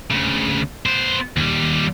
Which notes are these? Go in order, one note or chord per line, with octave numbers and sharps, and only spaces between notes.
D2 C#3
B3 C5
D#2 G3